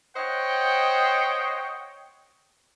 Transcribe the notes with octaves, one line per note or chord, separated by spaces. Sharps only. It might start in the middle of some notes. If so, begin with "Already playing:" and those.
C5 C#5 D#5 F#5 G5